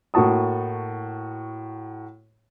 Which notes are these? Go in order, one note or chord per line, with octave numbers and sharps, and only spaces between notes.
A2 A#3 F#4 A5 D#6